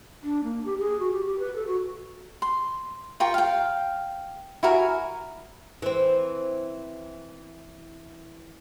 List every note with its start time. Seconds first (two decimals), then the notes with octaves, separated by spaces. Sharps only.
0.24 D4
0.44 A#3
0.65 G4
0.79 G#4
0.99 F#4
1.12 G4
1.27 G4
1.39 B4
1.55 A4
1.67 F#4
2.42 C6
3.20 F4 A#4 G5 C#6
3.34 F5 G5
4.63 E4 F#4 A#4 G#5
5.82 E3 C4